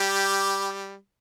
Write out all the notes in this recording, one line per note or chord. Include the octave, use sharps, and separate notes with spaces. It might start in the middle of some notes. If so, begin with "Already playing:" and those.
Already playing: G3 G4